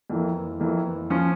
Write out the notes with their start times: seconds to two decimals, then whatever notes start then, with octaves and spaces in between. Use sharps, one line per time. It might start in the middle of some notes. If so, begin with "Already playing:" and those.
0.10 F2 E3 A#3
0.60 F2 E3 A#3
1.10 F3 C#4 F4 C#5